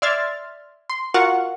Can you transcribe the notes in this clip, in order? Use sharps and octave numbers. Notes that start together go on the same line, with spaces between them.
D5 E5 C6 F6 G#6 A6
C6
F4 F#4 A#4 F5 F#5 C#6